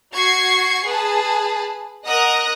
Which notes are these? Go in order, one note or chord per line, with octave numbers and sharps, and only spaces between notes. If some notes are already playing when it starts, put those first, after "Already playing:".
F#4 C#6 G#6 C7
G#4 B4 A5
A#4 D#5 F#5 A#5 D#6 F#6